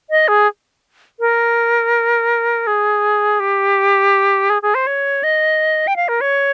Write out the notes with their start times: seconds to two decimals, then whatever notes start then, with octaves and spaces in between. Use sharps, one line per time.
0.10 D#5
0.28 G#4
1.20 A#4
2.67 G#4
3.40 G4
4.50 G#4
4.62 G#4
4.75 C5
4.87 C#5
5.23 D#5
5.87 G5
5.96 F5
6.08 A#4
6.21 C#5